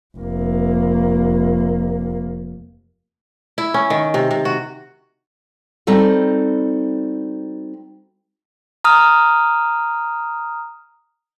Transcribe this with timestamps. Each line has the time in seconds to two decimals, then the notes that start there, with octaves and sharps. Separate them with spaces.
0.18 F1 A#3
3.58 E4
3.74 C#4
3.90 D#3
4.14 C3
4.31 C3
4.45 F#4
5.87 G3 C4 D#4 F#4 A4
8.84 A#5 D#6 F6